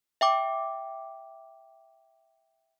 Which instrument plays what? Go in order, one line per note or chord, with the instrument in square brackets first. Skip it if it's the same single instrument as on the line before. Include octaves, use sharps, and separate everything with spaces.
[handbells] E5 G5 D6